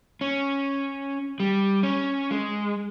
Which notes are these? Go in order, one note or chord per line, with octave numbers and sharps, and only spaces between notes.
C#4
G3
C#4
G#3